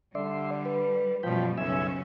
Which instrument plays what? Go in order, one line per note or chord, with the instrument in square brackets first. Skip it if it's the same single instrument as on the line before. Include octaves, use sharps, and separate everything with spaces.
[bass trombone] D3 [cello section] G3 [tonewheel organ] D5 E5 C6
[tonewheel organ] B4
[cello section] F#2 B2 G3 [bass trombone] F3 [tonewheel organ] G5 B5
[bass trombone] B1 [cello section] F#2 C#3 C#4 [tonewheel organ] E5 G#5 E6